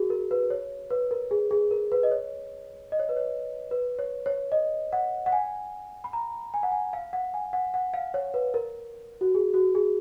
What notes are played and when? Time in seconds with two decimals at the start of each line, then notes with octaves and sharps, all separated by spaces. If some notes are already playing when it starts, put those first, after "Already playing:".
Already playing: F#4 G#4 A#4
0.10 A#4
0.31 B4
0.50 C#5
0.90 B4
1.11 A#4
1.31 G#4
1.51 G#4
1.71 A#4
1.92 B4
2.03 D#5
2.11 C#5
2.92 D#5
2.99 C#5
3.09 B4
3.17 C#5
3.71 B4
3.99 C#5
4.26 C#5
4.52 D#5
4.93 F#5
5.26 F#5
5.32 G#5
6.04 B5
6.13 A#5
6.54 G#5
6.63 F#5
6.72 G#5
6.93 F5
7.13 F#5
7.34 G#5
7.53 F#5
7.74 F#5
7.94 F5
8.14 C#5
8.34 B4
8.54 A#4
9.21 F#4
9.35 G#4
9.54 F#4
9.75 G#4